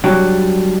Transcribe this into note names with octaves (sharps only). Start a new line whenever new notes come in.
F#3 G3 D4